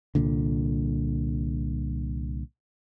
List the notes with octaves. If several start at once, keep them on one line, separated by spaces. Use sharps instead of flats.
C2 A#2 D3